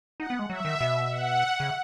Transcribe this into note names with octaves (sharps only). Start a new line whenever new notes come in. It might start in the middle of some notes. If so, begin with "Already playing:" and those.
D#4 F#5
B3
G#3
F#3 E5
D#3
B2
F#5
F#5
C#3